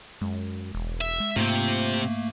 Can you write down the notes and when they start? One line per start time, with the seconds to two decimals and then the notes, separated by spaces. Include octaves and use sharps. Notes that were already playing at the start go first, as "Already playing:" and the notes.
0.21 F#2 G#3
0.75 E1
1.01 E5
1.20 G#3
1.36 G#2 C3 A3 A#3 C4 F4